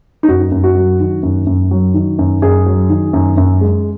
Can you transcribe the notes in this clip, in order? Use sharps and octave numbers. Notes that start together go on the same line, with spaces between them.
D#4
F#2 F#4
F#2
F#4
F#3
D#3
F#2
F#2
F#3
D#3
F#2
F#2 G#4
F#3
D#3
F#2
F#2
G#3